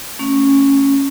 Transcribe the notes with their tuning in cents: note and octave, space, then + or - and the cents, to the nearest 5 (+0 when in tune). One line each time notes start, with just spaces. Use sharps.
A3 +25 C#4 -5